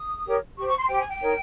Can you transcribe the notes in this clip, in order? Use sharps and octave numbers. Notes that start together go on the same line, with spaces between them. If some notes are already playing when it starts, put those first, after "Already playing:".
Already playing: D#6
G4 A#4 C#5
G4 C5 C#6
C#6
C6
G4 C5 G5
G#5
G5
D#4 A#4 C#5